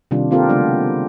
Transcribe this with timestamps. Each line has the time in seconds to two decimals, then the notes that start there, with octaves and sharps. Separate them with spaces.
0.11 C3 D#3 G3 D4 F4
0.31 A#3 C4 F4 G4 A4 A#4
0.49 C#3 F#3 G#3 B3 D4